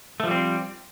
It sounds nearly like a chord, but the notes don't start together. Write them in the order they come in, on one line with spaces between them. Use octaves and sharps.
A3 F3 G3 C4